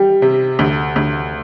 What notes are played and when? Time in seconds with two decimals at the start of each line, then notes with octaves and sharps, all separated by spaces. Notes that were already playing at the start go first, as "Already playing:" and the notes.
Already playing: G3 G5
0.22 C3
0.59 D2
0.96 D2